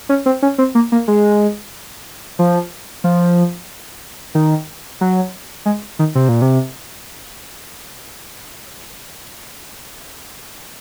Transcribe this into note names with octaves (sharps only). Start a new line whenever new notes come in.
C#4
C4
C#4
C4
A#3
A#3
G#3
F3
F3
D#3
F#3
G#3
D#3
C3
A#2
C3